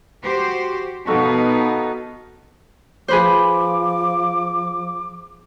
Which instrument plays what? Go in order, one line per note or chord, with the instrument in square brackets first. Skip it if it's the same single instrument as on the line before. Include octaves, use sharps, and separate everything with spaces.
[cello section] F#4 G4 C5
[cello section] B2 B3 D#4 [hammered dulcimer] F#4 A4 F5
[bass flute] F3 [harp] G#4 B4 C5 [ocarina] D6